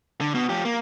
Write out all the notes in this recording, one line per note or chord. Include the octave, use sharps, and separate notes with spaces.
D3
B2
F3 G4
A#3